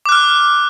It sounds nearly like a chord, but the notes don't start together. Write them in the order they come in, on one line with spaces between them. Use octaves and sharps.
D6 F#6 F6